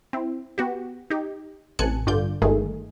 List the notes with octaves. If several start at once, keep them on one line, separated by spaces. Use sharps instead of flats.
C4 E4
B3 F#4 G4
D#4 G4
A1 C3 G#5 A5 F#6 C#7
G2 D3 F4 D5 G6
G1 G2 D#3 G#3 A3 G#4